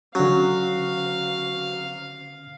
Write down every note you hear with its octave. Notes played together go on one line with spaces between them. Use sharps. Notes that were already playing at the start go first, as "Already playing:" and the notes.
D3 F#3 C#4 F5